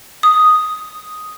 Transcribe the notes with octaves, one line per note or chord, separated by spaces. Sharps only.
D#6